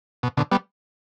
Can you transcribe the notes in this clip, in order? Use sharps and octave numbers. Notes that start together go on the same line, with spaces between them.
B2
B2 D3
G3 B3